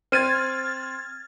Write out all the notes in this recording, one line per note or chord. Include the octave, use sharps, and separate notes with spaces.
C4 F6 G#6 A6 D#7